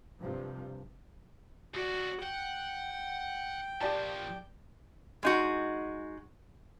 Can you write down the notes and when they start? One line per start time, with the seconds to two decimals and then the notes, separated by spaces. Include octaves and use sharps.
0.22 G2 C3 F3
1.74 C#2 F#4 D5
2.23 F#5 G5
3.81 A#2 F3 G4 D5 A5
5.23 G#3 D#4 F#4